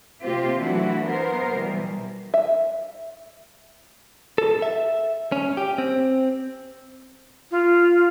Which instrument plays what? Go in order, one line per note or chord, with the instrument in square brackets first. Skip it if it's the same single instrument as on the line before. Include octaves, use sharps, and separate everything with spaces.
[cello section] C3 A#3 C4 F4 G4
E3 F#3 A3 D4 E4 F#4
B3 A#4 C5
B2 E3 G3
[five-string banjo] E5
[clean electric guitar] A4
E5
C#4
G4
C4
[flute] F4